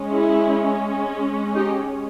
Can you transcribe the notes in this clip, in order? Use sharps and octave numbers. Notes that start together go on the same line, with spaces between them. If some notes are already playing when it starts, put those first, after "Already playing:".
Already playing: G#3 C#4
E4 G#4
D#4 G4